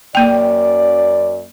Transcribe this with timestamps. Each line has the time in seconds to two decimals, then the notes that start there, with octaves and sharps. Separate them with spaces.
0.15 F#2 A#3 D5 G5